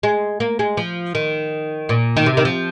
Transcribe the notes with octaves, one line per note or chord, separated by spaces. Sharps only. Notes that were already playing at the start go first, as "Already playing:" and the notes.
G#3
A#3
G#3
F3
D#3
A#2
D#3
C3
D#3
F3